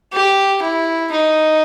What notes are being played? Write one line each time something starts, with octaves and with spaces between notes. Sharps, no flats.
G4
E4
D#4